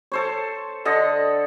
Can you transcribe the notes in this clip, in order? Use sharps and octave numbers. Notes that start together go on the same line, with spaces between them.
A4 C5 C#5
D3 A4 D#5